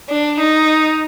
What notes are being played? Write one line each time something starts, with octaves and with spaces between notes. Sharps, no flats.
D4
D#4